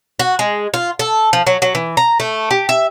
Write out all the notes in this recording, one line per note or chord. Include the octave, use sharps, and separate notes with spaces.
F#4
G#3
F4
A4
F3
F#3
F#3
E3
A#5
A3
G4
E5